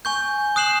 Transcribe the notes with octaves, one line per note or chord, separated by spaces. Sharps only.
G#5 C#6 G6
D#6 F#6 C7 E7 F#7